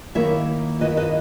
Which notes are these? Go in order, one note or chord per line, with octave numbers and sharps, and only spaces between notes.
D#3 A#3 E4 C#5 E5
D#3 A#3 E4 B4 D#5
B4 D#5